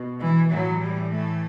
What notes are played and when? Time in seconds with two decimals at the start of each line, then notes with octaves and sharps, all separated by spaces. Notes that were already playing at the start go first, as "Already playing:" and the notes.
Already playing: B2
0.20 E3
0.50 A2 E3 F#3
0.80 G3
1.10 A3